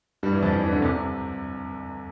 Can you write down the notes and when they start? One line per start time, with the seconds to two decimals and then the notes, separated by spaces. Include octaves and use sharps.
0.23 G2 G3
0.33 E2 E3
0.43 F2 F3
0.52 E2 E3
0.63 E2 E3
0.72 D2 D3
0.82 C2 C3
0.97 C2 C3